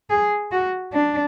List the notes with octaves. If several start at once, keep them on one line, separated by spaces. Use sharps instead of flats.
G#4
F#4
D4